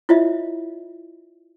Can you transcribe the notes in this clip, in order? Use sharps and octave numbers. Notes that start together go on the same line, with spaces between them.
E4 F4 C#5 D#5 E5